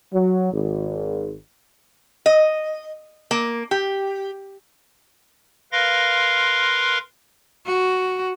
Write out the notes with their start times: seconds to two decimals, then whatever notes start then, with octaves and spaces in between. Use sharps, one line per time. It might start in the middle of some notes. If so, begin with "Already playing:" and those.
0.14 F#3
0.53 G#1
2.26 D#5
3.31 A#3
3.71 G4
5.72 A#4 B4 F5 C6 A#6
7.66 F#4